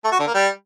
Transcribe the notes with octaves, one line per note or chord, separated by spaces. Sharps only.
A3
F#4
D3
A#3
G3